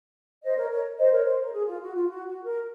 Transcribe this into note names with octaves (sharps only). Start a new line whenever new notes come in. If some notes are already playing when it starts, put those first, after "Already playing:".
C5 D#5
A#4 C#5
A#4 C#5
C5 D#5
A#4 C#5
C5
A#4
G#4
F4
F#4
F4
F#4
F#4
A#4